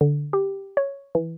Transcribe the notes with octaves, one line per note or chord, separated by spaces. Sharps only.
D3
G4
C#5
E3